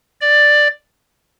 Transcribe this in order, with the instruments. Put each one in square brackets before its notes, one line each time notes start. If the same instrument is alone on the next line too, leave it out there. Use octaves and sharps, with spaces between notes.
[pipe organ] D5